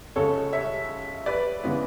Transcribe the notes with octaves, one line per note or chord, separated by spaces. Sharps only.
C#2 C#3 G#3 C#4 A4 C#5
C#5 E5
B4 D5
C#3 E3 G#3 B3